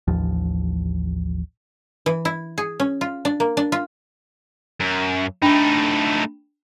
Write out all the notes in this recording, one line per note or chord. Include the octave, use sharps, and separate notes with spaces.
A1 D#2 F3
E3
E4
G#4
C#4
F4
D4
A#3
D4
F4
F#2
A3 D4 D#4 G5 B5